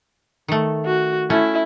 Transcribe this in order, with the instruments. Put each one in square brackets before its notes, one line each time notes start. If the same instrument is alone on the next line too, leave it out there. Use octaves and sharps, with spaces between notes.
[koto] D#3 A3
[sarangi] F#4
[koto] A3 C#4 [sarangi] E4